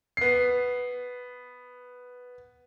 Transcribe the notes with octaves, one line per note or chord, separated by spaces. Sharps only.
B3 C7